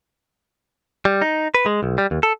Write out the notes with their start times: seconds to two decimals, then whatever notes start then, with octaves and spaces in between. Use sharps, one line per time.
1.05 G3
1.22 D#4
1.55 B4
1.66 G#3
1.83 B1
1.98 G3
2.11 D#2
2.23 A4